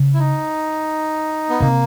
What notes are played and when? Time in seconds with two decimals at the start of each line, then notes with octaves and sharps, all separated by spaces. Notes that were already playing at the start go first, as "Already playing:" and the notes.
Already playing: C#3
0.14 E4
0.19 D#4
1.50 B3
1.60 C3 A#3